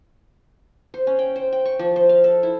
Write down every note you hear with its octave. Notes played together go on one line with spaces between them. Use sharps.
C5
C#4
G5
C5
G5
C#6
F3
C5
F5
A4
E4